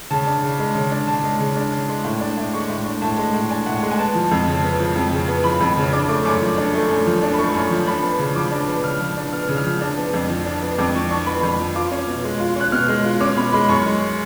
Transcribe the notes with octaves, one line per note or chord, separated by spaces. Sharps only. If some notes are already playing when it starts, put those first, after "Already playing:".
C#3 A5
D4
C#3
G#3
C#3
D4
C#3 A5
G#3
C#3
D4
C#3
G#3
A2
D4
A2
G#3 C#6
A2
D4
A2 A5
G#3
A2
D4 G#5
A2 F#5
G#3
G#5
B3 A5
F3
F2
C#3
B3
F3
F2
C#3
B3
F3 B5
F2
C#3
D4 D6
A3 D6
F#2 D6
F3
D4
A3
F#2
F3
D4
B5
A3 C#6
F#2
F3
D4 B5
B3
C#3
F3 D6
D4
B3
C#3 F6
F3
D4
B3 F6
C#3
F6
F3
D4
B3
F2
F3
D4
B3
F2 D6
F3 C#6
D4 C#6
B3 B5
F2
F3
F4 D6
C#4
B2
G#3
F4
C#4 F#6
B2 F6
G#3
F4
C#4 D6
B2 B5
G#3 B5
F#2 C#6
G#3